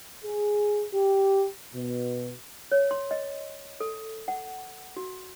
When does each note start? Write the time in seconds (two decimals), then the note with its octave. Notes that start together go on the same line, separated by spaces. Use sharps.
0.24 G#4
0.93 G4
1.74 B2
2.72 C#5
2.91 C6
3.11 D#5
3.80 A4
4.28 F#5
4.97 F#4